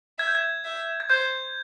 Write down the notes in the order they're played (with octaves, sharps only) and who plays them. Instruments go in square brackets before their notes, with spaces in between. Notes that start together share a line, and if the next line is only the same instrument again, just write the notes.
[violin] E5 [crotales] G#6
[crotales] G6
G#6
[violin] E5
[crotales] G#6
[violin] C5 [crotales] G6